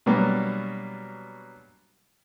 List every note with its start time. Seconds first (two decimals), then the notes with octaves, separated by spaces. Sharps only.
0.06 B2 F#3 G3 A#3 B3 D4